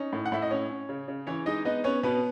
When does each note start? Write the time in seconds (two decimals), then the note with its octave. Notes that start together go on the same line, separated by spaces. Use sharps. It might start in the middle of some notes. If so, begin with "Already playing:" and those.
Already playing: C#4 D#4
0.13 A2
0.26 F#5
0.32 A2 E5
0.42 D#5
0.51 C#4 C#5
0.70 C#4
0.89 C#3
1.08 C#3
1.27 E3 C#4 C#5
1.46 G#3 D#4 D#5
1.65 B3 D#4 D#5
1.84 B3 C#4 C#5
2.03 B2 B3 B4